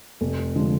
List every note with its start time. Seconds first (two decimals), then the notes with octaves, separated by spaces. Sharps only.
0.21 F1
0.56 D3 F3 G#3